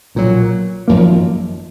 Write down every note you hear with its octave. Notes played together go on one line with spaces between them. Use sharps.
B1 A#2 F#3
G#1 F#2 F3 A#3